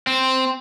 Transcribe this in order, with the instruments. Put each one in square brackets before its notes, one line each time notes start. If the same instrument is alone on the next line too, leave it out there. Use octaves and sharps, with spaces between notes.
[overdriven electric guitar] C4